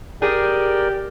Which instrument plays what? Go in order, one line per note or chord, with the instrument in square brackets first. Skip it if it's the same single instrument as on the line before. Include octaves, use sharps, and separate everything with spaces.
[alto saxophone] G4 [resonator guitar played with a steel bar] G#4 [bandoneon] A#4 D5